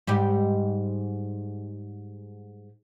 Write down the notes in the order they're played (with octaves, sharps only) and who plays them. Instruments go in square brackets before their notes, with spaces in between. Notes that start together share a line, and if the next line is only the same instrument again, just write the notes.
[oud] G#2 G3 G4